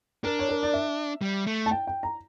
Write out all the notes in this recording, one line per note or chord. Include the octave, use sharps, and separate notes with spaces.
D4 A#4
C#5
A#4
D5
E5
G3
A3
A5
G5
G5
A#5